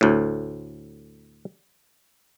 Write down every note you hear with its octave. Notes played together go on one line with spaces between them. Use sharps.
D2 A2